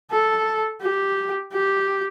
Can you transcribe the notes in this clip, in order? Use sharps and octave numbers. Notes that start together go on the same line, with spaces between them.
A4
G4
G4